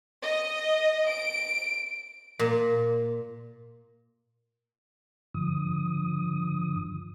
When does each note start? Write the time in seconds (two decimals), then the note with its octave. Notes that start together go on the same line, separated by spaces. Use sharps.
0.23 D#5
1.08 D7
2.39 A#2
5.34 G2 D3 F3 D#6